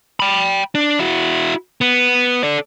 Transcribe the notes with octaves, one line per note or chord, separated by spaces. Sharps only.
G5 B5
D4
E4 F#4
B3
A4 D5